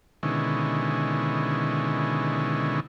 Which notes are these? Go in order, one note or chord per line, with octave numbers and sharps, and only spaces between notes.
B2 D3 D#3 G#3 C#4 E4